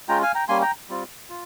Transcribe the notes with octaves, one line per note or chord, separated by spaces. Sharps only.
G#3 C#4 F4 G5 A#5
F5 G#5
G5 A#5
G3 A#3 C#4 G#5 C6
G5 A#5
G3 C4 F4
F4